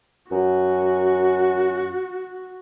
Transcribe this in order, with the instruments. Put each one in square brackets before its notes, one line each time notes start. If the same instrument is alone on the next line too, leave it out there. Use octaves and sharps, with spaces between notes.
[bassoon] F#2 [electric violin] F#4